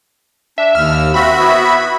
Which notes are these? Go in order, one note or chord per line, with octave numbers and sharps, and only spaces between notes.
D4 E5
D#2 E6 F6
C4 F#4 E5 B5
B3 E4